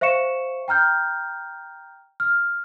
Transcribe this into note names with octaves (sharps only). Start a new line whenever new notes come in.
C5 E5 F5 C#6 C#7 E7
G5 A#5 F6 G6
F6